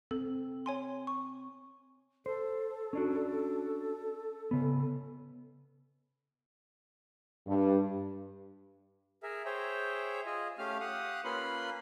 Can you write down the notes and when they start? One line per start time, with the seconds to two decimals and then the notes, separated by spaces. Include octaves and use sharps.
0.11 C4 A4
0.66 C#5 G#5 C6
1.07 C#6
2.26 A4 C5
2.93 C#4 D4 F#4
4.51 C#3 B3
7.47 G2
9.23 G#4 A#4 E5
9.45 G#4 C5 C#5 E5 G5
10.26 F4 G#4 D#5
10.58 A3 C#4 G4 F5 F6
10.80 G4 F5 F#5 D#6
11.25 A#3 C#4 F4 B4 B5 C6